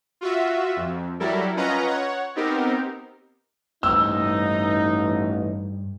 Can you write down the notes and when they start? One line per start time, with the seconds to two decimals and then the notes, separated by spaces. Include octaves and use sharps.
0.21 F4 F#4 E5
0.76 F2
1.20 F#3 G3 E4 A4 A#4
1.56 C#4 F4 B4 D#5 F#5 A#5
1.87 C#5 F#5
2.35 B3 C4 D#4 G4 A#4
3.83 A1 G2 D#4 C5 E6